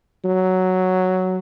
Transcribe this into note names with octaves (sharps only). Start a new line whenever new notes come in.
F#3